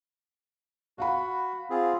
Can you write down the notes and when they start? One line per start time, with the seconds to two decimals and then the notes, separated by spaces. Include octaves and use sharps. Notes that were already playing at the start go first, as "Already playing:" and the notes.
0.98 F#4 F5 F#5 B5
1.70 C4 F4 G#4